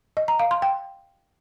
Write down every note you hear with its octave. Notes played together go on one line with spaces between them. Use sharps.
D#5
A#5
F5
C6
G5